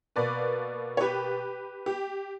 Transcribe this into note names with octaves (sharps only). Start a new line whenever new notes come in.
B2 A#3 B4 D5
C#5
G4 B4
G4